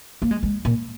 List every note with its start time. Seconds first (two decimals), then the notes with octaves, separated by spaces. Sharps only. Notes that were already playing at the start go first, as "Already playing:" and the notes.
0.22 A#3
0.31 G#3
0.43 G#3
0.65 A#2